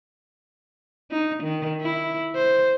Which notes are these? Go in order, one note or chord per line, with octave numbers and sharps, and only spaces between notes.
D#4
D#3
E4
C5